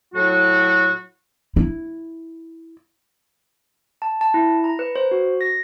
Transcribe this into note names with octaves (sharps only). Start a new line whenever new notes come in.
A2 F#3 E4 F#4
E4
A5
A5
E4
A#5
B4
C5
F#4
A#6